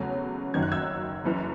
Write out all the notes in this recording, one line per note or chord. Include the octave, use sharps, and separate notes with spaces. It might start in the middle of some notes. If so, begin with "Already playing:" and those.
Already playing: E2 C#3 F#3 A3 C#4
F#1 F#2 D#3 F#3 G#6
F#6
E6 G#6
F#1 F#2 E3